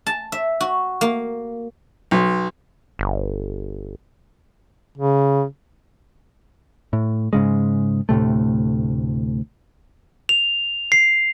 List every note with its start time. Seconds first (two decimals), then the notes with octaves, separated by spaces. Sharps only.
0.07 A5
0.32 E5
0.61 F#4
1.01 A#3
2.11 B1
2.99 G1
4.98 C#3
6.93 A2
7.33 G#2 C#3 G#3
8.09 D2 A2 C3 A3
10.29 F7
10.92 C7